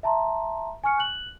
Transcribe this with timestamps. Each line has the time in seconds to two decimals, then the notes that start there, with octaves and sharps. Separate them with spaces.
0.03 E5 A5 A#5 C6
0.84 G#5 C#6 F6 C#7
0.98 F#6 F#7